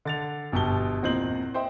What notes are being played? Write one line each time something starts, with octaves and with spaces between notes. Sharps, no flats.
D3 A6 F7
G1 B2 G4 A5 G7
E2 A#2 C4 D#5 G6 F#7
C5 D#5 E5 G5 C6